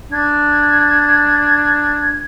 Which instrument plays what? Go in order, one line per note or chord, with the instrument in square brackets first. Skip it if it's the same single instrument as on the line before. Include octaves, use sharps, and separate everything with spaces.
[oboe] D4 [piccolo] G#6